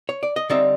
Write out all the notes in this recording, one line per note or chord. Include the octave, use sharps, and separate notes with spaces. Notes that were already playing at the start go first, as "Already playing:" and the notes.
C#5
D5
D#5
D3 G3 C4 D#4 D5 E5